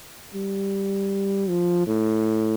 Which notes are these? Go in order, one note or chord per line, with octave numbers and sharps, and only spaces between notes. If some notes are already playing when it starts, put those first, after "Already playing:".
G3
F3
A2